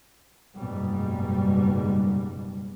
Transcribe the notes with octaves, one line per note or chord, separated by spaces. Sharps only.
F#1 G#2 B2 G3